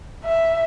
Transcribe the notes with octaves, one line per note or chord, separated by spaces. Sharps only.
E5